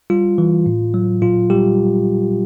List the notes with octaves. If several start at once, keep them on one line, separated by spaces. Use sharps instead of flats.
G3 F4
E3
A2
F#3
A#2 F4
G3 G4